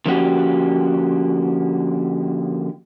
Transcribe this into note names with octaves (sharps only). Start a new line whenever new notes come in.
D3 F3 A#3 C#4 F#4 G4